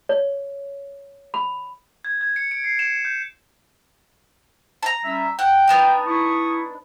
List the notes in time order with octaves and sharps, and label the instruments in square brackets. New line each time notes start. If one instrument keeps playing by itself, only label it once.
[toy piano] C#5
B5
[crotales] G#6
G#6
C#7
D7
C7
E7
G6
[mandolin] A5 A#5
[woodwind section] G3 C#4 E5
[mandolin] F#5 [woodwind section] G5
[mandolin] B3 D4 D#4
[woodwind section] E4 C#6 D#6